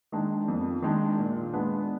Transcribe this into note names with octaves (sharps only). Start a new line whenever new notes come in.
D#3 G#3 D4
F2
D#3 G#3 D4
A#2
G#3 B3 D4